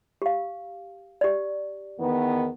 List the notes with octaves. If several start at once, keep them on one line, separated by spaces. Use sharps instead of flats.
G4 F5
G4 D5
E2 D#3 B3